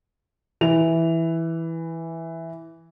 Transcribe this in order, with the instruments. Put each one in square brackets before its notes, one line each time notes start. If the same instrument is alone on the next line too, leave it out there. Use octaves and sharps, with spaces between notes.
[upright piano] E3 F7